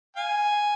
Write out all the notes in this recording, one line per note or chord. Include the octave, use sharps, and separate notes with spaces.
F5 G#5